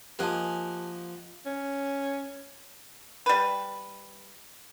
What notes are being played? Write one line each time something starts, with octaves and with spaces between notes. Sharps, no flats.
F3 A#3 G4 D#5 F#5 G#5 A5
C#4
G3 B4